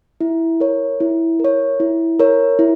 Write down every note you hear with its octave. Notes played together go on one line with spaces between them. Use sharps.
E4
A#4 C#5
E4
A#4 C#5
E4
A#4 C#5
E4